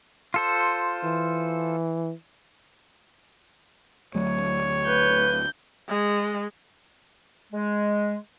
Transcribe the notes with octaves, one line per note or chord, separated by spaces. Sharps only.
F4 A4 C5
E3
D2 F#3 A3 C#5
B4 G6
G#3
G#3